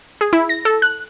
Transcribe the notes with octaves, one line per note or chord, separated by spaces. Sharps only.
G#4
E4
A#6
A4
F#6